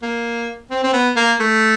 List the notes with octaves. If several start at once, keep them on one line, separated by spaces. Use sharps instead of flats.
A#3
C4
C4
B3
A#3
A3